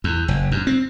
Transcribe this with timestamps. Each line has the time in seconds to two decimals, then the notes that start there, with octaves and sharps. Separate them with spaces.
0.04 E2
0.28 F#1
0.52 F#2
0.67 C4